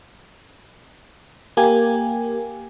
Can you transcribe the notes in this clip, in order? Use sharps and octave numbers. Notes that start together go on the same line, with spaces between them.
A#3 G4 G#5